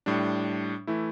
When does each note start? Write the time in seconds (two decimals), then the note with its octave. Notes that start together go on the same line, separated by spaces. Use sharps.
0.06 A2 G3 D4
0.87 E3 A3 E4